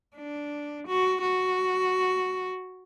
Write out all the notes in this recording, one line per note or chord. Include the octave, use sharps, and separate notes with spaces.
D4
F#4
F#4